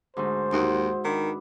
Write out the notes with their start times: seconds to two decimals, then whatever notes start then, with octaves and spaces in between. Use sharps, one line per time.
0.17 D2 G#2 G#3 C5
0.52 D#2 D#4 E4 F#4
1.04 D#3 D4 B4